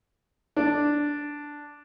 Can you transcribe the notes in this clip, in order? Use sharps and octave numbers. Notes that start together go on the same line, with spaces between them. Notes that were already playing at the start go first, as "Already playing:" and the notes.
D4